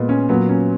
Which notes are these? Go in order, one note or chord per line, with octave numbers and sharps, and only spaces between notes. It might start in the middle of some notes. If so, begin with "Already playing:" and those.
Already playing: A#2 G#3 B3
C#4
A#2 F#3 B3
C#4